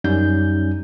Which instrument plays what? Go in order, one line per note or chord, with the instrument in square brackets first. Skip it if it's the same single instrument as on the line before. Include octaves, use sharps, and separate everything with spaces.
[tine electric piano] F#2 G3 C#4 D#4 G6